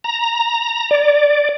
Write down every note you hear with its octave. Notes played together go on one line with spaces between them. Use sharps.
A#5
D5